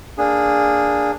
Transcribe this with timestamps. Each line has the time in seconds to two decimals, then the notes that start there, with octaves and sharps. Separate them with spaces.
0.18 A#3 D4 G#4